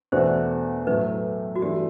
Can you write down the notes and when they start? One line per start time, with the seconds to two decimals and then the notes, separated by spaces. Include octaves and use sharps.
0.12 E2 B2 A3 D4 F#4 C5
0.87 A2 F#3 A3 B4
1.56 F#4
1.62 G2 E3 A3 D4 G4